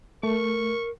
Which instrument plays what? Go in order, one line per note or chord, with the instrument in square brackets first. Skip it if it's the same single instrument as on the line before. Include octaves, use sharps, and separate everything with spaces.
[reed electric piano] A3 [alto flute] A#4 [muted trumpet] C#6